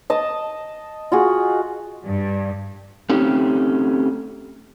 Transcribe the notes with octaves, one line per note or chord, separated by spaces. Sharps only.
D#5 A5 D#6
F4 F#4 G#4
G2
A3 C4 C#4 D#4 G4